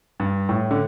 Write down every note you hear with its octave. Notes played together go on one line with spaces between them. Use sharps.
G2
A2
D3